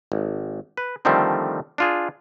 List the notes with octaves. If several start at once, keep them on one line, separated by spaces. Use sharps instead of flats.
G#1
B4
D3 D#3 F3 G3 A3 C4
D4 F4 G#4